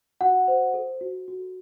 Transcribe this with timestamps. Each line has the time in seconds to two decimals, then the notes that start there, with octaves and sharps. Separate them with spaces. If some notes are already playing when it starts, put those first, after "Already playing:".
0.21 F#4 F#5
0.48 C5
0.74 A4
1.01 F#4
1.28 F#4